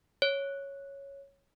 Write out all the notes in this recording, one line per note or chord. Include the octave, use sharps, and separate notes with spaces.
C#5